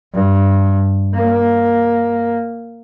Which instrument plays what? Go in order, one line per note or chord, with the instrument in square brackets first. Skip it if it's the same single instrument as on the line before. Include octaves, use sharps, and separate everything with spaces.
[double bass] G2
A#3